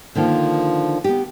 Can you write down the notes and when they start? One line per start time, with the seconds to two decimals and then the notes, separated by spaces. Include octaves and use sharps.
0.15 D3 D#3 F3 A#3
1.04 B3 G4